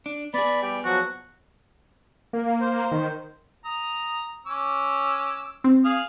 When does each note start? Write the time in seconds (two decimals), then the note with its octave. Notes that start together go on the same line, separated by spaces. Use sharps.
0.06 D4
0.34 B3 G#4 D5 B5
0.62 G3 G4 G5
0.85 F3 F#3 F#4
2.33 A#3
2.61 C5
2.92 D#3
3.65 A#5 D#6
4.47 C#4 D6 E6
5.64 C4
5.85 G#4 F5 D#6